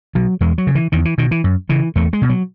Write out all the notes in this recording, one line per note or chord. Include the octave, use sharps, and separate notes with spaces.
B2 F#3
E2 G#3
F#3
C#3
E3
E2 D#3
E3
B2 D#3
E3
F#2
C#3 E3
E2 A3
G#3
B2
F#3